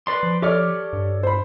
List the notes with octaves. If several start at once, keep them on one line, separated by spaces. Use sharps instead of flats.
B4 D5 C6
F3
G4 A4 C#5 D5 D6 F6
G2
C5 B5